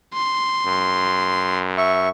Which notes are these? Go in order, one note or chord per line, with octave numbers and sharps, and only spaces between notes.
C6
F#2
E5 C#6